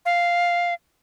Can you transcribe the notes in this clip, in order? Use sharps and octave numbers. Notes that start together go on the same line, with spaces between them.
F5